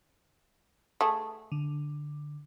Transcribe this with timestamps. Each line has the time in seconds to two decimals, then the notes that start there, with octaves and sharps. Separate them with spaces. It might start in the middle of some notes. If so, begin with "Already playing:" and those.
1.01 A3 G#4
1.52 D3